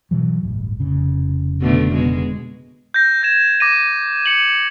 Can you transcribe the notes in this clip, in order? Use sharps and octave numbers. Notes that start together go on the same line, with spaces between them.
B2 E3 F#3
D1 G1
F1 C#3
B2 D3 A3
B2 G#3
G6 A#6
G6 G#6 E7
D6 A#6 D#7
C#7 D#7 F#7